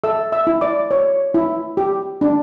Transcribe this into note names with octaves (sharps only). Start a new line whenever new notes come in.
A4 E5 E6
E5 E6
E4
D5 D6
C#5
E4
G4
D4